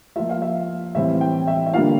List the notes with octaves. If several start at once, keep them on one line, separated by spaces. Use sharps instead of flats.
F3 A#3 F4 E5
F5
E5
A2 E3 G3 C4 E4 E5
G5
E5
E5
D3 G3 A#3 D4 F4 F5